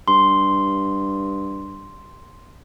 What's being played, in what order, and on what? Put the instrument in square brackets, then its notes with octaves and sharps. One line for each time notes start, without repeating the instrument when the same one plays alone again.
[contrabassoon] G2 [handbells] C6